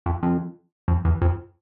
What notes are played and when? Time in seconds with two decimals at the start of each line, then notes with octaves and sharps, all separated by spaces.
0.06 F2
0.23 F2
0.88 F2
1.05 E2
1.22 F2